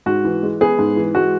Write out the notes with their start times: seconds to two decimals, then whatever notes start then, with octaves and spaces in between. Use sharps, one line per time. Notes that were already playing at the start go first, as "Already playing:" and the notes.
0.06 G#2 F#4
0.25 E3
0.43 G#3
0.61 B3 G#4
0.79 G#2
0.97 E3
1.15 G#3 F#4